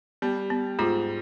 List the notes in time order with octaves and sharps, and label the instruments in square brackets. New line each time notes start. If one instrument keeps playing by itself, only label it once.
[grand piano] G3 [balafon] B3
[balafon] B3
[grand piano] G#2 [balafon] F4